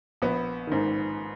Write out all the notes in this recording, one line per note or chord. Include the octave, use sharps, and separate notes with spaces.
A#1 B3
G#2 D#3